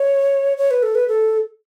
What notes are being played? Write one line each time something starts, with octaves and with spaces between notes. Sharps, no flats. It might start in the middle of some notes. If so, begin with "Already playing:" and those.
Already playing: C#5
C#5
B4
A4
B4
A4